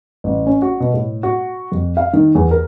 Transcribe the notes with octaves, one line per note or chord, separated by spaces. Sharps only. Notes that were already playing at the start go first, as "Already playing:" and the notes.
A1
C#4
F#4
B2
A2
F#4
F2
F5
D#3
E2
A#4